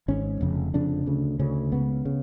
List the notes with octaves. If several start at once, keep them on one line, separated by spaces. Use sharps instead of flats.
G#1 G#2 C#4
F1 F2 C#3
F1 F2 C#3 D4
D2 C#3
D2 C#3 C#4
C#2 C#3 B3
C#3